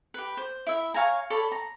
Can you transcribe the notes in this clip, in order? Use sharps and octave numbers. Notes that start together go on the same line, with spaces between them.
G4 B4
C5
E4 E5
C#5 F5 G#5 A#5
A4 C#5 D5 B5
A#5